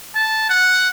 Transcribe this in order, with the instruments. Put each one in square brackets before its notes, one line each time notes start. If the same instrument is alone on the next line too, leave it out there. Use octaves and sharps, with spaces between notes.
[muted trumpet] A5
F#5